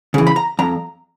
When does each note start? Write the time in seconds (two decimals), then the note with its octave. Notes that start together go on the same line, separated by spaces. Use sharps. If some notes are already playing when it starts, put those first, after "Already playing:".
0.14 C#3 E3
0.27 B5
0.36 A#5
0.59 F2 A#5